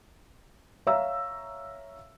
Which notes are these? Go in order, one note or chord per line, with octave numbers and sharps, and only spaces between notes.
C#5 E5 F5 A#5 E6